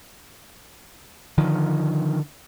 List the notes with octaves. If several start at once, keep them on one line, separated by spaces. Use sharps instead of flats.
D3 D#3 F3